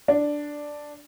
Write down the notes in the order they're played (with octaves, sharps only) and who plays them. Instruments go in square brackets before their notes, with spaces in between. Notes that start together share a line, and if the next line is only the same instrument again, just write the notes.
[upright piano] D4